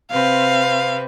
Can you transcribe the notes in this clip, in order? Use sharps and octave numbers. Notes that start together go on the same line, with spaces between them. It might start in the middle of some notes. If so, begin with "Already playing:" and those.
C3 C4 B4 F5